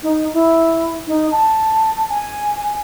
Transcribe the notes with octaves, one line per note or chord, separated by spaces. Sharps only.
D#4
E4
D#4
A5
G#5